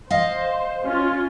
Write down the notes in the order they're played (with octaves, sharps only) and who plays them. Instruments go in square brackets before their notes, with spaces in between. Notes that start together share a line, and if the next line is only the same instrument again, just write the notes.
[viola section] C5 [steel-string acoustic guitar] D#5 F5
[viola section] C#4 F4